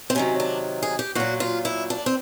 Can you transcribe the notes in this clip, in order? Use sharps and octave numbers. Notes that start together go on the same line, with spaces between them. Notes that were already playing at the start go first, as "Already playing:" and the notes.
C4
C3 D#3 F#3 C#4
D4
G#4
G4
A#2 F#3 F#4
F4
E4
D4
C4